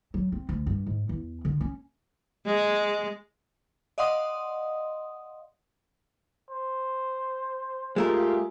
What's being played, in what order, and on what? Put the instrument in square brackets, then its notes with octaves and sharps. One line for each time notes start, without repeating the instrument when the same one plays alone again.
[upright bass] F#3
C4
D2
G2
G#2
E2
D3
C#4
[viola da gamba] G#3
[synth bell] D5 D#5 F5 F#5 C6 D#6
[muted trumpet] C5
[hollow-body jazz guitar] G#3 A3 A#4 [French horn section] F4 G4 G#4